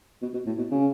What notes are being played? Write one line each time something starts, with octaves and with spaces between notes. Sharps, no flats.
B2
B2
A2
B2
C#3